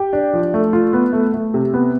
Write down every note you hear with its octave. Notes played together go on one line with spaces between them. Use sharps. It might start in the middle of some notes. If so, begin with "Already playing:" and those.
Already playing: G4
D4
F3
A3
F4
B3
A3
A3
C3
B3